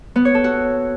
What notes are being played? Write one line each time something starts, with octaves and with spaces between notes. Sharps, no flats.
B3
C#5
A4
F#4